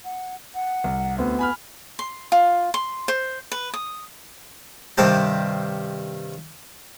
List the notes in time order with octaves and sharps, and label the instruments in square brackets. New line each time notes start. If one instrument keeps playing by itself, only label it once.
[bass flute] F#5
F#5
[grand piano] C2
[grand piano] D2 C4 [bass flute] B3
[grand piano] G#5 B5 F6
[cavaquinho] C6
F4
C6
C5
B4
D#6
[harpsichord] G2 C3 D#3 C4 C5 A5